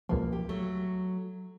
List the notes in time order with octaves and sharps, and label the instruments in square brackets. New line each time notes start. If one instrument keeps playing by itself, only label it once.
[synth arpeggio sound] C#2 B2 F3 [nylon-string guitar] A#3
[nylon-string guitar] G4
F#3 A3